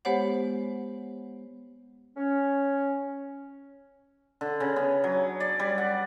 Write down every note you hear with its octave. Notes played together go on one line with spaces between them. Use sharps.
G#3 B3 G4 C5 C#5 F#5
C#4
D3
C#3
B3
F#3
D5
G3
F#5